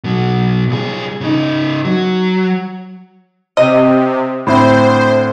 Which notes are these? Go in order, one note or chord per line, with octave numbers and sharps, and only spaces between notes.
B2 F#3
C2 G#4
C#3 D#4
F#3
C3 D#5
A2 D3 C4 C5 E5 B5